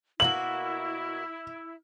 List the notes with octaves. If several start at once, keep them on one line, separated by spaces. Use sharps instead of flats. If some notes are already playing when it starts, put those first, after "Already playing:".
B2 A#3 E4 F#4 F#7